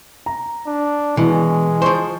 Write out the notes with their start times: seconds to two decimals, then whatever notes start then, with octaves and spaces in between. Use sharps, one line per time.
0.26 A#5
0.67 D4
1.17 B2 E3 G#3
1.82 F3 C5 C#6